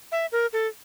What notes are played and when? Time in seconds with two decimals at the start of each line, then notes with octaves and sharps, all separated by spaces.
0.12 E5
0.32 A#4
0.53 A4